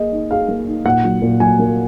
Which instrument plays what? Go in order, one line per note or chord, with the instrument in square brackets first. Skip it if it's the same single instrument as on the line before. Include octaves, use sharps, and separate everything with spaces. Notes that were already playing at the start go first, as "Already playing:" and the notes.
Already playing: [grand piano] A#3 G#4 [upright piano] D#5
[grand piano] D#4
[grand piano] G#4 [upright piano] F5
[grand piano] A#3
D#4
[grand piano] A#2 [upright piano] F#5
[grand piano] F#3
A#2
[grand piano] F#3 [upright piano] G#5
[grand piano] A#3